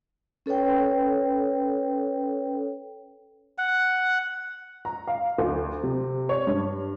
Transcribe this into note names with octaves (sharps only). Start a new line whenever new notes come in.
C#4 A4 B4 C#5 G5
F#5
A#5
F5
D2
C3
C#5
G2